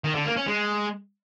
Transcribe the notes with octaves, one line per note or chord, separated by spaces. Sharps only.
D#3
D3
A#3
C#4
G#3